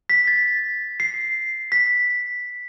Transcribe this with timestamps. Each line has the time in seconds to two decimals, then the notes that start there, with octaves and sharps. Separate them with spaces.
0.10 B6
0.27 A6
1.00 C7
1.72 B6